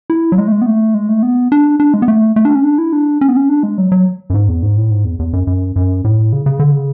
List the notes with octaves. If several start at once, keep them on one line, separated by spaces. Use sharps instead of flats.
E4
F#3
G#3
A3
G#3
B3
A3
G#3
A3
B3
D4
D4
G#3
B3
A3
A3
D4
C#4
D4
E4
D4
C#4
B3
C#4
D4
G#3
F#3
F#3
F#2
G#2
E2
G#2
A2
G#2
E2
E2
F#2
F#2
F#2
A2
C#3
C#3
D3
C#3